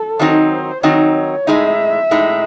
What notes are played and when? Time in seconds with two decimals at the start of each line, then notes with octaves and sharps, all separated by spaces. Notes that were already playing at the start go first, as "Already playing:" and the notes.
Already playing: A4
0.19 D#3 F#3 C4 D#4 C5
0.83 D#3 F#3 C4 D#4 C#5
1.47 A2 G#3 D#4 E5
2.11 A2 G#3 D#4